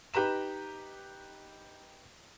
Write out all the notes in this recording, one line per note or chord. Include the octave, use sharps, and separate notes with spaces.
D#4 G4 B4 A#5 E7